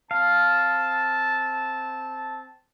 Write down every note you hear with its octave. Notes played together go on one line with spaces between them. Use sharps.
C4 F5 A5